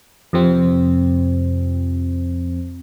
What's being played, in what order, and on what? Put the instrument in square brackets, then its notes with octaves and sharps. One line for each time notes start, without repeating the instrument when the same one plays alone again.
[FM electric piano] F2 C3 F3 C4